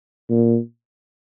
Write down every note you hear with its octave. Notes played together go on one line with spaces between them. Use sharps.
A#2